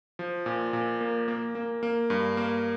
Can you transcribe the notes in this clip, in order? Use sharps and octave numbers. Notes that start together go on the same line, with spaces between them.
F3
A#2
A#2
A#3
A#3
A#3
A#3
G2
A#3